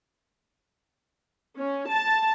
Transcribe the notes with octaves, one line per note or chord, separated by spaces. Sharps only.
C#4
A5